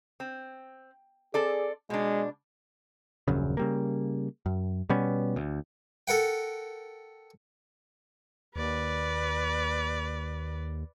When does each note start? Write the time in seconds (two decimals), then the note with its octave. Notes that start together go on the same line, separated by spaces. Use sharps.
0.20 C4
1.34 C4 G#4 A4 D5
1.90 B2 G#3 D4
3.28 D#1 A#1 F#2 C#3
3.57 C#3 G3 A#3
4.46 F#2
4.89 B2 G3 B3 C#4
5.36 D2
6.08 A4 A#4 F#5 G5
8.56 D#2 B4 D5